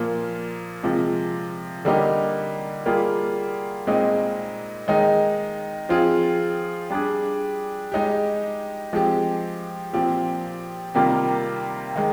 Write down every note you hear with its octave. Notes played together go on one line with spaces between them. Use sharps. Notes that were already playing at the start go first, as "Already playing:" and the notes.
Already playing: A#2 F3 A#3
C3 F3 G#3
D3 G3 A#3 D#4 G4
G3 A#3 F4 G#4
A#2 G#3 C4 D#4
D#3 G#3 D#4
F3 C4 F4 G#4
G3 D4 G#4
G#3 D#4 G4
F3 G#3 C4 G4
A#2 F3 C4 G4
C3 D#3 G3 A#3 F4
D#3 G#3